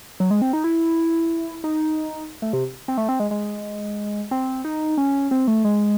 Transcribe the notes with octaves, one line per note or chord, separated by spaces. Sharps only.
F#3
G#3
C4
D#4
E4
D#4
A3
C3
C4
A3
C4
G#3
G#3
C4
D#4
C#4
C4
A3
G#3